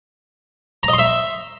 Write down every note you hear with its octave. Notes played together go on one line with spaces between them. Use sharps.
A#5
D#5
C6
E5